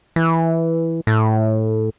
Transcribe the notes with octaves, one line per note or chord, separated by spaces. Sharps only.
E3
A2